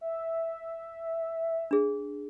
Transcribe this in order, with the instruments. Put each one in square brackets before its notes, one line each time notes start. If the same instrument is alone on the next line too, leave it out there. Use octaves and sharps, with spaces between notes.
[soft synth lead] E5
[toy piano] D4 G#4